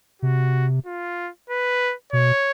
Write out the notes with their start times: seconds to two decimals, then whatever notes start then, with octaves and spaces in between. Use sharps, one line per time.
0.22 C3 F#4
0.86 F4
1.50 B4
2.13 B2 C#5